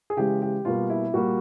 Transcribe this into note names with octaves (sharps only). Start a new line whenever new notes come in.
G#4
C#3 E3 G#3 G4
G4
B2 G3 A#3 F4
E4
A#2 G3 A#3 F#4